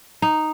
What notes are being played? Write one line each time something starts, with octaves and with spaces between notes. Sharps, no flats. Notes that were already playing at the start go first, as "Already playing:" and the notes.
D#4